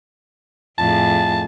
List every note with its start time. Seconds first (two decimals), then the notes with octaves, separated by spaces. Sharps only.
0.78 F2 A2 G#4 A5